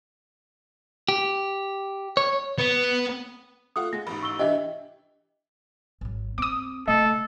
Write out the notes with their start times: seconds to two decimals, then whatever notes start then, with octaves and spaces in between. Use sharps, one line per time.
1.09 G4
2.17 C#5
2.58 B3
3.76 A3 F4 F#5 D#6
3.93 G#3 A#6
4.07 A1 G#2 B5
4.22 C#6 E6 G7
4.39 E3 D4 E4 G4 D#5 E5
6.01 G#1 F#3
6.38 C4 D6 D#6
6.88 C#3 A3 A4 D#5